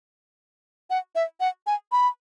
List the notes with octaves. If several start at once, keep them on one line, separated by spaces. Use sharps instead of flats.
F#5
E5
F#5
G#5
B5